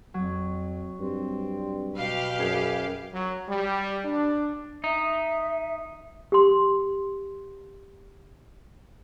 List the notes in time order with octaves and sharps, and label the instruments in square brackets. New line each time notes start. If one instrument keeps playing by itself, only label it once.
[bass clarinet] F2 [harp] F#3
[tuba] G2 [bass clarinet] C4
[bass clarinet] B2 [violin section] G4 B4 F5
[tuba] F#2 [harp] G#4
[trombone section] F#3
G3
D4
[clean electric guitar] D#4 [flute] E5
[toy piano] G4 C6